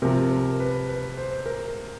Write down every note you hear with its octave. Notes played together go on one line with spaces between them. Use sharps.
C3 F3 A#4
A#4
B4
B4
C5
A#4